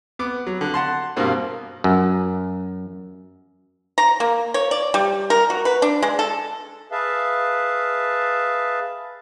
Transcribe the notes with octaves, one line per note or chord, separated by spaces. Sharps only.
B3 D6
F#3
D3
F#5 A5 C6
G2 B2 A#3 C4
F#2
A#5
A#3
C#5
D5
G3
A#4
F#4
B4
D4
G#3
A4
G#4 B4 E5 F5 A5